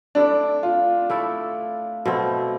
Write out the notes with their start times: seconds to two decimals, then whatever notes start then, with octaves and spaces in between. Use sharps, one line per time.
0.15 A3 D4 E4 A4 D5
0.63 F4
1.10 A3 E4 A4 D5
2.05 B2 A3 C4